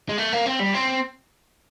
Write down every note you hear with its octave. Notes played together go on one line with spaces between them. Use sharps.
G#3
A3
A#3
C4
G3
C4